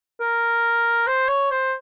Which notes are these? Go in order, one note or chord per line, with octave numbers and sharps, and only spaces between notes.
A#4
C5
C#5
C5